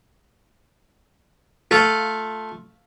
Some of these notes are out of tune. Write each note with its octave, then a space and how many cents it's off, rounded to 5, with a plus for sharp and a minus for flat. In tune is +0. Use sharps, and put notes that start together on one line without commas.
A3 +0 F4 +5